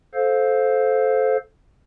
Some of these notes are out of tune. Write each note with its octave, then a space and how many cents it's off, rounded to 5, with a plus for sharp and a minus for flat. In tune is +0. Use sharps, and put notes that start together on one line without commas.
A4 -15 C5 +0 F5 +10